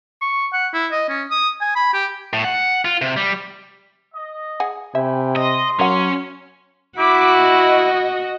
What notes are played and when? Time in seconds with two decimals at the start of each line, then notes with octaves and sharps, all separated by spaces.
0.21 C#6
0.53 F#5
0.74 E4
0.92 D#5
1.09 C#4
1.31 D#6
1.61 G#5
1.75 B5
1.93 G4
2.33 A2
2.44 F#5
2.85 F4
3.02 C3
3.17 G3
4.14 D#5
4.60 G#4 F#5
4.95 C3 E5 G5 G#5 B5
5.36 D#5 C6
5.79 F#3 C#4 A#4 F#5
6.99 E4 F#4 D6 B6
7.38 D#5